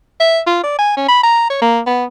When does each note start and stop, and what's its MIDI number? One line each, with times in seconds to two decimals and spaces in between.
0.20 0.40 76
0.47 0.61 65
0.63 0.77 74
0.78 0.95 80
0.97 1.06 61
1.08 1.20 83
1.23 1.45 82
1.50 1.57 73
1.61 1.80 58
1.86 2.05 59